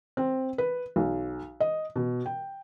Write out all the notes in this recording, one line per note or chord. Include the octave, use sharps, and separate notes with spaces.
C4
B4
B1
D#5
B2
G5